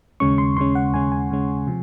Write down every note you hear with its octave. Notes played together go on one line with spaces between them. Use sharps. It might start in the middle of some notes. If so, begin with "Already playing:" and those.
D#2 C#3 G#3 C#4 C#6
C6
D#2 C#3 G#3 C#4 C6
F#5
D#2 C#3 G#3 C#4 G#5
G#5
D#2 C#3 G#3 C#4
C3 F3